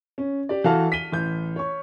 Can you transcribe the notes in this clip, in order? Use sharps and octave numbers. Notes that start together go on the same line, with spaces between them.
C#4
G4 D5
E3 F#4 A4 F5 A5 F6
B6 D#7 G7
A1 G6
C#5 C#6